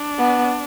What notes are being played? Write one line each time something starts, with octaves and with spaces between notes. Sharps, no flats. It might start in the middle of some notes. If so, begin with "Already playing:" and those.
Already playing: D4
B3